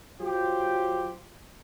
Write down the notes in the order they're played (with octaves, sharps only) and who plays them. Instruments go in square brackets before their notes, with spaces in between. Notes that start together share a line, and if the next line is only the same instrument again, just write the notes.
[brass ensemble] F#3 F4 G4 C5